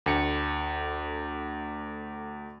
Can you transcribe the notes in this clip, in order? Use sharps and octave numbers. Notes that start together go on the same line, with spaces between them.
D2 A3 G5 C#7